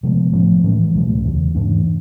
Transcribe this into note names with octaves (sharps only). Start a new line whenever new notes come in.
C3 F3 G#3 B3
A2 F3 A3 C#4
A2 E3 G#3 C#4
C#2 B2 F#3 A3
E2 C#3 E3
G#2 E3 A3 D4